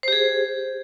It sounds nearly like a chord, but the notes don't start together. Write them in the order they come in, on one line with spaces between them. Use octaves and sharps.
C5 G4 G#4